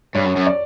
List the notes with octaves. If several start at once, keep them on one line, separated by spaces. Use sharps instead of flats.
G2 C#5
F#2
F#2
D5